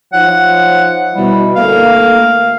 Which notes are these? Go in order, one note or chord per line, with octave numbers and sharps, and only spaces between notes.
F3 D#4 C#5 F#5
B2 G3 E4
D2 A3 A#3 F5